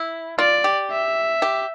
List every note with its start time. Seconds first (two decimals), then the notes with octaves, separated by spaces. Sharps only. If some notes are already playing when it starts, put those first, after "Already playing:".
Already playing: E4
0.39 F4 D5
0.64 G4
0.90 E5
1.42 G4